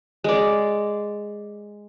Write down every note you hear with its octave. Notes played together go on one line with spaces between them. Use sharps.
G#3 D5